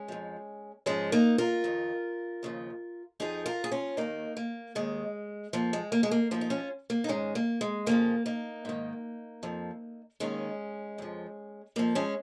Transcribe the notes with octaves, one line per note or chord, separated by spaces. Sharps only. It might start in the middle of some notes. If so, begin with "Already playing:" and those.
Already playing: G#3 C#4
F2 F3
G#2 F3 G#3 C#4
A#3 D#4
F4 A#4
F2 D#3
D#2 C#3 F3
F2 F3 D#4 G#4
F4 A#4
G#4
C#4 F4
D#2 D#3 A#3 D#4
A#3
D#2 D#3 G#3
F2 F3 A#3
G#3
A#3
G#3
A#3
G#2 F3 A#3
D#4
C#4 F4
A#3
D#4
G#2 D#3 G#3 C#4
A#3
G#3
F2 C#3 F3 A#3
A#3 D#4
G#2 D#3
F2 F3
D#2 D#3 G#3 C#4
F2 F3
F2 F3 A#3
G#3 C#4